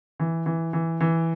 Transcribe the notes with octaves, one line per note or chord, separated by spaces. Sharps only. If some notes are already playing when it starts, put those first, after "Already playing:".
E3
E3
E3
E3